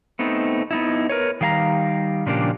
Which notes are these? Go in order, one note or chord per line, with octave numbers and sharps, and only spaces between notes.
A3 B3 C4 D#4
B3 D#4 E4
A#4 B4 C#5
D#3 G3 F5 G#5 A#5
A#2 C#3 F3 A#3 D4 G4